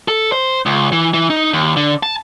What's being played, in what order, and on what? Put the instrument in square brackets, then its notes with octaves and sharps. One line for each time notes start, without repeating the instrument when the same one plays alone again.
[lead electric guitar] A4
C5
C#2
E3
E3
D#4
D#2
D3
A5